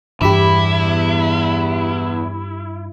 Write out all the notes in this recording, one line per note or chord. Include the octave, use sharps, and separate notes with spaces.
E2 G2 E4 G4 B5 D6